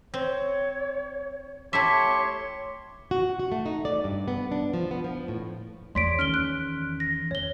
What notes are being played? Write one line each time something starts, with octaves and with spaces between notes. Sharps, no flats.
C4 C#5
A3 E4 G4 C#5 E5 C6 C#6
F#4
F#4
A3
D#4
D5
G2
B3
D4
F3
B3
F3
A2
E2 C#5 D5 C6 B6 D7
D#3 C#4 F6 D7 G7
F#6
A#6
F2 C#5 G7